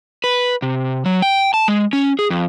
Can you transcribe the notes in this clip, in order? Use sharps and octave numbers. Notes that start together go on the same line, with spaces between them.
B4
C3
F#3
G5
A5
G#3
C#4
G#4
F2